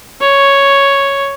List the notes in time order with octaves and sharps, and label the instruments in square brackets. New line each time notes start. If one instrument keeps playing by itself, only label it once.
[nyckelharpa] C#5